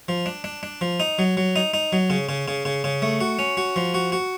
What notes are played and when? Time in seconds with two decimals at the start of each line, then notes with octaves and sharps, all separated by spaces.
0.08 F3
0.26 D4
0.44 D4
0.63 D4
0.81 F3
1.00 D#4
1.19 F#3
1.37 F#3
1.56 D#4
1.74 D#4
1.93 F#3
2.10 C#3
2.29 C#3
2.48 C#3
2.65 C#3
2.84 C#3
3.02 A3
3.21 F#4
3.39 C#4
3.57 F#4
3.76 F3
3.94 F#4
4.12 F#4